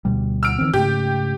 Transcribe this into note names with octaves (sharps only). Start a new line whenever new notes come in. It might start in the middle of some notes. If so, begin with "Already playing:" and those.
D2 B2 G3
E6 F6 D7
D#3 E3 C4
G#2 C#3 A3 G4